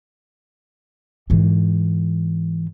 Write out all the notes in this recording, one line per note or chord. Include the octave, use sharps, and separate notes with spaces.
G#2 E3